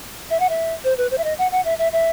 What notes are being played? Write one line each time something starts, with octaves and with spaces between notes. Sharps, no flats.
E5
F#5
E5
C5
B4
C5
E5
D#5
F#5
F#5
E5
E5
E5